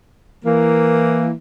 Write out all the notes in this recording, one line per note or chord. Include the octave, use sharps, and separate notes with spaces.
E3 A#3